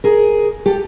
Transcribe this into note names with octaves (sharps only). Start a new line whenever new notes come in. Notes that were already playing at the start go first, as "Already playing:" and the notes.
G#4 A#4
G4 A4